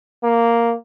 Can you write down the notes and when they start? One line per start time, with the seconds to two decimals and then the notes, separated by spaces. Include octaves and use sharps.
0.23 A#3